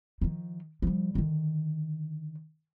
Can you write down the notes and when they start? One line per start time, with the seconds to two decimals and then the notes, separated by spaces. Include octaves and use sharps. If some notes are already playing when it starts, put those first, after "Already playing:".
0.21 D#3 F3
0.82 F3 G3
1.15 D3 D#3